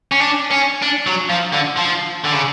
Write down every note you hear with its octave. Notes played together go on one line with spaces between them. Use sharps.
C#4
D4
C#4
D4
F#3
F3
D3
F3
D3
C#3